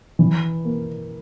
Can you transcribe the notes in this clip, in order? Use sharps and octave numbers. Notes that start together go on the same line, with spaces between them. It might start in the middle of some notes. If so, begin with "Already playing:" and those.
E3
A#3